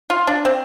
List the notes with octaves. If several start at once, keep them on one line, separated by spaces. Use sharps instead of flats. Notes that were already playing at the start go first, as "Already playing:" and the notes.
F4
D4
C4